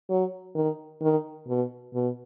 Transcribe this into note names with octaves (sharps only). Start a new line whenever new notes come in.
F#3
D#3
D#3
B2
B2